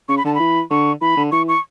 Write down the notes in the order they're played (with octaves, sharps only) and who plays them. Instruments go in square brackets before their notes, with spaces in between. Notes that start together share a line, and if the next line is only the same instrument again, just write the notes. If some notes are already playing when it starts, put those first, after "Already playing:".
[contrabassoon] C#3 [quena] C#6
[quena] B5
[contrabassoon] D3 [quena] A5
[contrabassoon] E3 [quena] B5
[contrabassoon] D3 [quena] C#6
[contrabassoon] E3 [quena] B5
[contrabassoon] D3
[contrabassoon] E3 [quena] C#6
[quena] C#6